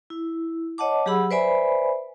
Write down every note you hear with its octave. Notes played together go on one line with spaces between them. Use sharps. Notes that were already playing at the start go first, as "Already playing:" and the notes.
E4
C#5 D#5 F#5 A5 D6
F#3 G4 G#4 F#5 B5 E6
B4 C5 D5 E5 G#5 B5